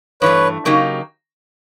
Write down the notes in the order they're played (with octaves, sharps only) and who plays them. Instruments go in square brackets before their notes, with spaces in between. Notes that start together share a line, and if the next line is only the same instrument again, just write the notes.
[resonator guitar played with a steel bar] G2 E3 A3 [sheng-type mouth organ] B4 C#5
[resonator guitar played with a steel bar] C#3 F#3 A#3 D#4 G4